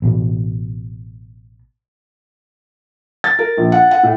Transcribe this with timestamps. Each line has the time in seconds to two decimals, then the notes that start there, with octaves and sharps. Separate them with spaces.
0.02 A1 B2
3.24 A6
3.39 A#4
3.57 A#1
3.72 F#5
3.91 F#5
4.03 A2